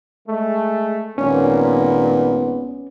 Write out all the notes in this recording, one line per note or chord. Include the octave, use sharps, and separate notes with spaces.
G#3 A3
G#1 A#2 B3 C#4